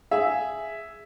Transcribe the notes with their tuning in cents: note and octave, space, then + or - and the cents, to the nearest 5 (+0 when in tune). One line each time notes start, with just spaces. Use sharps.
G#4 +0 E5 +0